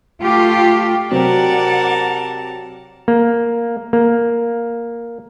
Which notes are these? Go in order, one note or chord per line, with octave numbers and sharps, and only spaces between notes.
A3 F4 G4
C3 F#3 A#4 C5 D5 F#5 G5 A5
A#3
A#3